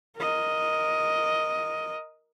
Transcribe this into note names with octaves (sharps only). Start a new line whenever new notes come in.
A#4 D#5